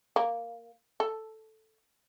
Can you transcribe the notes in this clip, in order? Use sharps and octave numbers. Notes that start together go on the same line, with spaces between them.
A#3
A4